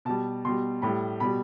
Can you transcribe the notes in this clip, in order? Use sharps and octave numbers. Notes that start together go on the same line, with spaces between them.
B2 G3 A5
B2 G3 C6
A2 G3 B5
B2 G3 B5